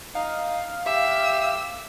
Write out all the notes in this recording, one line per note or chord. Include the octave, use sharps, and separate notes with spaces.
D#4 F5
G4 E5 E6